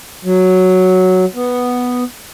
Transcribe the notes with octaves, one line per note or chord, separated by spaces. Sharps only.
F#3
B3